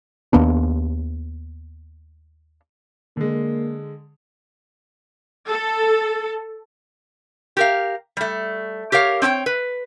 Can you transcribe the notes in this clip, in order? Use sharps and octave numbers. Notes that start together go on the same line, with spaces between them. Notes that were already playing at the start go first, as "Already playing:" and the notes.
D#2 A#3 B3 D4
D3 G#3 A#3
A4
G4 A#4 F5
G3 A3
G4 A#4 C#5 F5
C4 D4 C#5 G5
B4